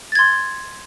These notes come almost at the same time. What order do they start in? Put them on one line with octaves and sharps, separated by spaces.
A6 G#6 C6